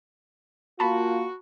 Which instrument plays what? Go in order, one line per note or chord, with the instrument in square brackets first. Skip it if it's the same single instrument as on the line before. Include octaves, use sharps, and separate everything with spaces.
[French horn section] A#3 F4 [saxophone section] F#4 [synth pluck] A5 B5